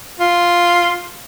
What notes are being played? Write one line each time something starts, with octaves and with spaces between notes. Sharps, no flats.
F4